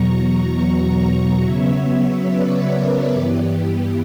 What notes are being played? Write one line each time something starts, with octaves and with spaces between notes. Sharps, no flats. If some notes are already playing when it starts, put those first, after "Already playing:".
Already playing: E2 B2 F#3 A#5 C#6
C#3 F#3 B3 C#5 E5
B4 D5
A#4 C#5
G2 E3 B3 G4